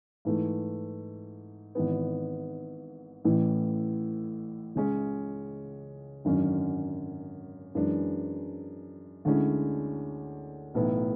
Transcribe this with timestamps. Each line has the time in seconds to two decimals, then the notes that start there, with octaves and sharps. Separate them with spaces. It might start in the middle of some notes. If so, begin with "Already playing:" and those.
0.25 G#2 E3 A3
1.75 G#1 G#2 E3 B3
3.25 A1 A2 E3
4.75 C#2 C#3 G#3 C#4
6.25 G#1 F#2 D3 F#3 C#4
7.75 F#2 E3 G#3 D4
9.25 D2 D3 G#3 C#4 E4
10.75 B1 A2 E3 B3 E4